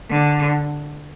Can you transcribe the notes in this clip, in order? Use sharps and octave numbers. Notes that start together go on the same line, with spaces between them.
D3